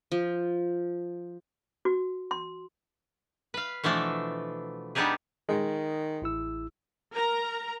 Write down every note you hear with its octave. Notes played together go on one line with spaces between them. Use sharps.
F3
F#4
C6
B4 F5
B2 E3 F3 A3 D4
G3 B3 D4 D#4 G4 G#4
D#3 G#3
A1 E4 E6
A#4 A#5